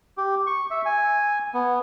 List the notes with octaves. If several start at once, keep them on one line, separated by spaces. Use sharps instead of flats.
G4
C#6
E5
G#5
B3